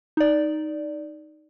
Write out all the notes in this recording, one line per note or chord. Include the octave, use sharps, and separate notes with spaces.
D#4 D5